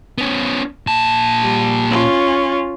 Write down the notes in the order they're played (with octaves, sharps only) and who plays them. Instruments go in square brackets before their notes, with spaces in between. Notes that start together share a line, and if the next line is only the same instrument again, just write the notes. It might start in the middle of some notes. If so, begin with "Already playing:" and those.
[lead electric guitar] B3 C#4
A#2 A5
[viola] G3
C#4 F4